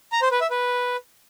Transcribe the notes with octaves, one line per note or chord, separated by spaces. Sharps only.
A#5
C5
B4
E5
B4